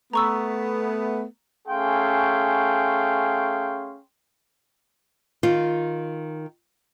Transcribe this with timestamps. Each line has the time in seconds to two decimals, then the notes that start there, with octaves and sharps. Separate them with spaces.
0.13 A3 B3 A#5 C#6 E6
1.67 A3 C#4 G#4 F5 G5 C6
5.43 D#3 F4